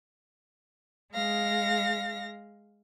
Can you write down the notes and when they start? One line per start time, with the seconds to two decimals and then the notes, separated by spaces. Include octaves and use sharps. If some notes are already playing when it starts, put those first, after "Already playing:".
1.13 G#3 F5 A#6